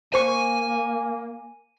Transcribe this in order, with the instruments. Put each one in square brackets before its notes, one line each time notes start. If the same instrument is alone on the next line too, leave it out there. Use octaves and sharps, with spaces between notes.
[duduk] A#3 [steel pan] C5 C#6 [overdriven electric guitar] G#5